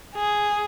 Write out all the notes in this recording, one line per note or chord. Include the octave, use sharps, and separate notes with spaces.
G#4